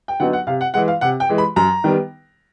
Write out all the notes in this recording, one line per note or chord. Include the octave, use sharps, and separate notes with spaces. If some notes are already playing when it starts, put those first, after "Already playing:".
G5
D3 F#3 B3 D#4 F#5
F#5
C3 F5
F#5
E3 G#3 F#5
F5
C3 F#5
G5
E3 G#3
B5
F#2 A#5
D#3 G3 B3